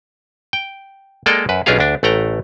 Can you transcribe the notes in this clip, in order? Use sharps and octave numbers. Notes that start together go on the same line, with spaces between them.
G5
G#3 A#3 A4 D5 D#5 G5
F#2 B4
B1 C#4 D4 F4 G#4 F5
D2 D4
A1 A3 F#5 G5 A#5